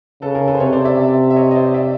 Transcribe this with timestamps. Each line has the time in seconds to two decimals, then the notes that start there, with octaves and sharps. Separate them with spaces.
0.22 C#3 A4 B4
0.35 G#4 A#4
0.48 A4 B4
0.55 C5
0.60 C3 B4 C#5
0.73 C5 D5
0.85 D5 E5
1.30 E5
1.36 C#5 D#5
1.51 D#5
1.56 C5 D5
1.74 D5 E5